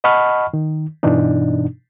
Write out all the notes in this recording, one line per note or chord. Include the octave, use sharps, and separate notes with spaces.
D#5 F#5 A5 B5 C#6 F6
D#3
G2 B2 E3 D4 D#4